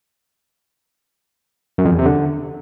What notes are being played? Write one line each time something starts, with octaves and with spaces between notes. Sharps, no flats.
F#2
F2
E2
C3
D3